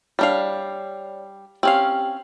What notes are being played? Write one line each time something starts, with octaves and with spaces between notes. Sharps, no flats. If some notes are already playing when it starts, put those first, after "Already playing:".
G3 D4 C#5 D5 F5
C4 C#4 G4 F5 G5 F#7